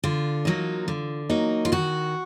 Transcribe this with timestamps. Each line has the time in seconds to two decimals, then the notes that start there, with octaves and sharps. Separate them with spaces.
0.04 D3 F4
0.45 F#3 A#3 D#4
0.88 D3
1.30 F#3 A#3 D#4
1.65 F4
1.72 D#3 F#4